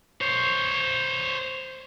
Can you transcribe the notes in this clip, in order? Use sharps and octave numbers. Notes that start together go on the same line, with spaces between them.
C5 C#5